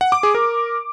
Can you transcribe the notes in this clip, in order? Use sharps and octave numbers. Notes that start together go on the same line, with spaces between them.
F#5
D6
G#4
A#4